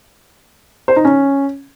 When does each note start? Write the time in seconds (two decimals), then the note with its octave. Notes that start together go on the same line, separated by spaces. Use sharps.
0.88 C5
0.96 D#4
1.05 C#4